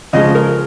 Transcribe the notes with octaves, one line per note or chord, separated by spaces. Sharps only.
C#3 F3 G#3 D#5
A#4